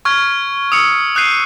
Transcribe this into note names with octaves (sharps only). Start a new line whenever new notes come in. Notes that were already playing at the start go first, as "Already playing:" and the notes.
C#6 F6 G#6
D#6 E6 C#7
D#6 F#6 G6 C7 D#7